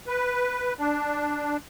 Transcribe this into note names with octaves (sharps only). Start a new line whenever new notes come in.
B4
D4